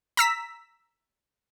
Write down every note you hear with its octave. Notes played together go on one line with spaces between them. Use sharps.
A#5 E6 B6